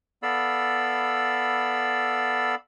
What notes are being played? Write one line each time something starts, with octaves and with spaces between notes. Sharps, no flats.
B3 A4 D5 F5 B5 E6